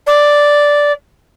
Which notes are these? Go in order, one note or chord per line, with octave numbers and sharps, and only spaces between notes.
D5